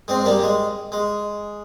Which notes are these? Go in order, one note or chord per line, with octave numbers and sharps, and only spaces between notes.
G#3 C4
G3 A#3
G#3
G#3